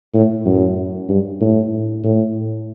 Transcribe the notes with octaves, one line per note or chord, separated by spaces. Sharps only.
A2
F#2
G2
A2
A2